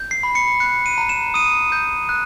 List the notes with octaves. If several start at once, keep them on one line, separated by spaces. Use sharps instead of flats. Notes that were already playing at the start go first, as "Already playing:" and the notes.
Already playing: G6
C7
B5
C#7
F#6 C#7
D#7
A#5
E7
D#6 D#7
G6
F#6